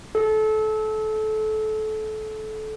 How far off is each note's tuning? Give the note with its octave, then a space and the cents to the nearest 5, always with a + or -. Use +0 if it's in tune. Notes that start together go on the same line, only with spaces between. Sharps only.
A4 -25